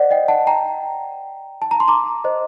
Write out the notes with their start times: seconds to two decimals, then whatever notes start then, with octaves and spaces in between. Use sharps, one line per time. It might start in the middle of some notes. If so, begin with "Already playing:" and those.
Already playing: C5 D5 D#5 F#5
0.11 D#5 G5
0.28 F#5 A5
0.47 G5 A#5
1.62 A5
1.71 A#5
1.80 C6
1.88 A#5 D6
2.24 C5 D#5